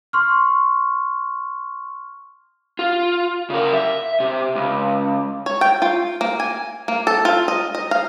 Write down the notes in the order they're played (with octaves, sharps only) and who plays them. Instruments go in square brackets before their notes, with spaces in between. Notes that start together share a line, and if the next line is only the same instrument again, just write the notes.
[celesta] C6 C#6 F6
[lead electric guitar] F4
C#3 A#4
E5
C3
C#2
[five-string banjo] C#5
G5
F4
A#3
G#5
A#3
A4
F4
D#5
D#5
F5